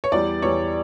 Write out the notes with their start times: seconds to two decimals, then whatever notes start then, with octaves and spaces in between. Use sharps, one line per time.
0.04 C#5
0.12 E2 E3 G3 D5
0.42 E2 E3 G3 C#5